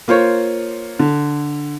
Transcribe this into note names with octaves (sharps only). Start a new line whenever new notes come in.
A#3 F4 C5 C#5
D3